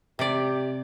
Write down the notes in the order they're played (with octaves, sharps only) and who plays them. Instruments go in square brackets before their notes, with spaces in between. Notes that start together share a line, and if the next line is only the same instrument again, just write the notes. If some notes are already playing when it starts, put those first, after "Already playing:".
[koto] C3 D5 [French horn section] G4